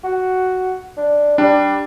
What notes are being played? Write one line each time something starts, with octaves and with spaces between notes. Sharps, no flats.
F#4
D4
G3 D4